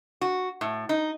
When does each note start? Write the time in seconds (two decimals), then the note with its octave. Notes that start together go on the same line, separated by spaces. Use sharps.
0.21 F#4
0.61 A2
0.89 D#4